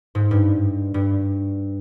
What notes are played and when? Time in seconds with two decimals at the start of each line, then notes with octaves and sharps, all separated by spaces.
0.15 G#2
0.31 G2
0.94 G2